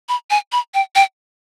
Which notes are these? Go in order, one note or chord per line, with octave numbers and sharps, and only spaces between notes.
B5
G#5
B5
G5
G5